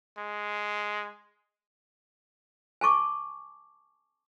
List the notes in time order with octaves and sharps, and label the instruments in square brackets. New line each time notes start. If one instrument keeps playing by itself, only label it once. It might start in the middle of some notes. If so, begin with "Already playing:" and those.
[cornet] G#3
[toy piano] G#5 A5 C#6 D6